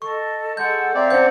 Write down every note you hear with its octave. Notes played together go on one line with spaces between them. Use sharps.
A4 D#5 C#6
G#3 A4 F#5 G6
C4 D5 E5 F5 A#5
C#4 C5 F#5 G6